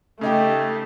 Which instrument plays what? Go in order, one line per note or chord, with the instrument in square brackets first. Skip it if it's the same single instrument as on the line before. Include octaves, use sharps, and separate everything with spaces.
[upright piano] C#3 D#4 G4 [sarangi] A3